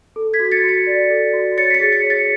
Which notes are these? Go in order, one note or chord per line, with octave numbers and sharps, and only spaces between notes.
A4
G#6 B6
F#4
A6 C#7
F#4
A6 C#7
D5
A4
F#4
C#5 A6 C#7
B6
A6 C#7
G#4
A6 C#7
C#5
A6 C#7